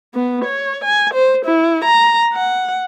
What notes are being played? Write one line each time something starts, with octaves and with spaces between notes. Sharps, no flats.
B3
C#5
G#5
C5
E4
A#5
F#5